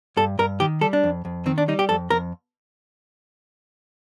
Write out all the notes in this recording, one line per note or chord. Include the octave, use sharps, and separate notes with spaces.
G2 A4
G2 A#4
D#3 G4
G3 A4
D4
F2
F2
D#3 C4
D4
G3 D#4
G4
F2 A4
F2 A#4